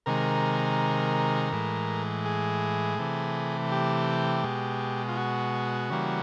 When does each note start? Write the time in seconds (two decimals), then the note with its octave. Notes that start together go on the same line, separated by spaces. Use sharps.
0.06 C3 D#3 G#3 A#4
1.53 A2 E3 G#3
2.25 G#4
2.99 C3 E3 A3
3.72 G4
4.44 B2 G#3
5.09 F4
5.17 F#4
5.90 C#3 E3 G3 A#3